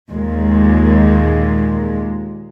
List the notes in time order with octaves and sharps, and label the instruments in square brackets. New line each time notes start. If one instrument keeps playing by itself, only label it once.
[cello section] D#2 A#2 G#3